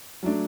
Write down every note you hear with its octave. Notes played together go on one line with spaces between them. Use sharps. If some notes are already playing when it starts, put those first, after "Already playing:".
F#3 A3 D4